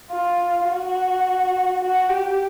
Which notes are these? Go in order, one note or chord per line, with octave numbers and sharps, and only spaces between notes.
F4
F#4
F#4
G4